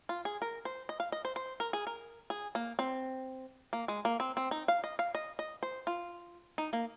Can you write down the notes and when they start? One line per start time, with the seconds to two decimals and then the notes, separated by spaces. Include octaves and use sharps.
0.09 F4
0.25 G#4
0.42 A#4
0.65 C5
0.89 D#5
1.00 F5
1.12 D#5
1.25 C5
1.36 C5
1.60 A#4
1.73 G#4
1.87 A#4
2.30 G#4
2.55 A#3
2.79 C4
3.73 A#3
3.88 G#3
4.05 A#3
4.20 C4
4.37 C4
4.51 D#4
4.68 F5
4.84 D#5
4.99 F5
5.15 D#5
5.39 D#5
5.63 C5
5.87 F4
6.58 D#4
6.73 A#3